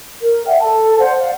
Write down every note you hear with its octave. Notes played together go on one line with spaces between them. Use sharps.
A#4
D5 E5 F#5 G5
A4 A5
C5 D5 F5 F#5
D5 F5 F#5